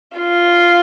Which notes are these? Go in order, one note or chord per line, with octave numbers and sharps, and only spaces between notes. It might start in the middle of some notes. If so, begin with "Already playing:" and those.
F4 F5